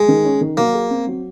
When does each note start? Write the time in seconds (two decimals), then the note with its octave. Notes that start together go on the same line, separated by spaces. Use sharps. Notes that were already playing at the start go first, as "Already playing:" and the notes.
Already playing: G#3
0.08 D#3
0.25 C#4
0.41 D#3
0.57 F#3 A#3
0.74 G#4
0.90 C4
1.07 F#3